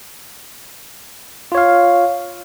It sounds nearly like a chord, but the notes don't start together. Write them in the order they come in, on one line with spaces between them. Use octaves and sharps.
F4 C#5 F5